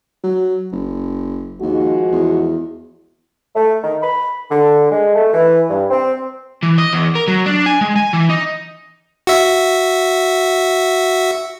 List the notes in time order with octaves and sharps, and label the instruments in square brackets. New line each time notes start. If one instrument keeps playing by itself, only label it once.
[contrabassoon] F#3
F#1
[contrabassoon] D#2 [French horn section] F3 G#3 F#4
[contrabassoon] E2
[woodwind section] A3
D#3
B5
D3
G#3
A3
E3
G2
C4
[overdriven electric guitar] E3
D#5
E2
A#4
F#3
D4
G#5
G#3
G#5
E3
D#4
[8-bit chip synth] F#4 E5